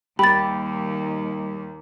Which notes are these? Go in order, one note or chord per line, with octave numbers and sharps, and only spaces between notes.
D#2 G3 G4 B5 A6